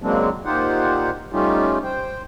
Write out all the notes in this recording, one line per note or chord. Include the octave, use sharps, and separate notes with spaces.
C#3 F#3 G#3 A#3 C4 D4
A#2 D#4 F4 G4 C5 F#5
G3 A3 C#4 D#4 F4 G4
C5 G5